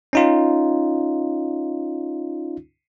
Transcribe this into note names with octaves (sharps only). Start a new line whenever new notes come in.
C#4 D#4 F4